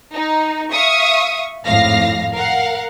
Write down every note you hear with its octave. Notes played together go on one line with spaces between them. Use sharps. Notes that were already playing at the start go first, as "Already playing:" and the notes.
D#4
E5 F5 C#6 D#6
G#1 F2 A2 F5 A#6
A#4 F5 F#5